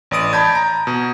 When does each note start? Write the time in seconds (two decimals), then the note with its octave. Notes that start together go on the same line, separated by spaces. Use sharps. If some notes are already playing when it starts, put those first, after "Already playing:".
0.11 A1 D5 D#6 D7
0.33 A5 B5 G6 G#6
0.55 A#5
0.87 B2